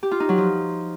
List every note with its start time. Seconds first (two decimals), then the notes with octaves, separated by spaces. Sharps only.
0.03 G4
0.11 F4
0.20 D#4
0.29 F#3
0.38 F3